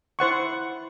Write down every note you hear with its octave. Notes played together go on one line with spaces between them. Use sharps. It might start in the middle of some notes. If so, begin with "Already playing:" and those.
E4 C5 F#5 C#6